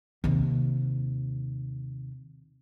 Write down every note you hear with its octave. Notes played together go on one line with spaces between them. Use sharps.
D#2 C3